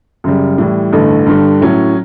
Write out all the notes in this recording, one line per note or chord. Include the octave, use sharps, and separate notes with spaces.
F#2 C#3 G3
A2 E3 G3
A1 G2 D3 A3
G2 D3 G3
A2 F#3 C#4